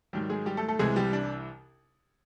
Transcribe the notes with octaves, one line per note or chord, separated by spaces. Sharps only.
G#2 D#3 F#3 G3 G4
G#3 G#4
G3 G4
A3 A4
A3 A4
C2 C3 E3 G#3 G#4
G3 G4
D4